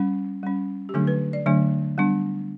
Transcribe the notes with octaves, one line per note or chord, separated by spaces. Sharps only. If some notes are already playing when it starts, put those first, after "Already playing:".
Already playing: G3 C#4
G3 C#4
G4
D3 F#3 A3 D4 A4
B4
D5
D3 F#3 A3 D4
G3 B3 D4